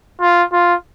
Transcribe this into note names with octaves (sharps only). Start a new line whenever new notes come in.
F4
F4